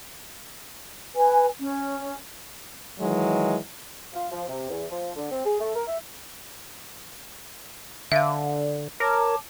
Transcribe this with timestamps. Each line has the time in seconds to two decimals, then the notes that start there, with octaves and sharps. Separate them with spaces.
1.15 B4 G#5
1.60 C#4
3.00 D#3 E3 F#3 G#3
4.14 F4
4.31 F3
4.49 C3
4.69 E2
4.90 F3
5.16 D3
5.31 C4
5.45 G#4
5.60 A3
5.76 A#4
5.87 E5
8.12 D3 E5 F5
9.00 A#4 C#5 A5 D6